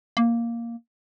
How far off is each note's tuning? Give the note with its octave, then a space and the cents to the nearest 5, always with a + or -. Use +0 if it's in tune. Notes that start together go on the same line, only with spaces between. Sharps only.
A#3 +0